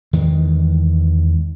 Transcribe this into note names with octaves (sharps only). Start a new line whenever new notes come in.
E2 D#3 E3 G#3